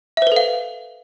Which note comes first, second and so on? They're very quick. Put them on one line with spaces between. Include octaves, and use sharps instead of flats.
E5 C5 B4 A4 F5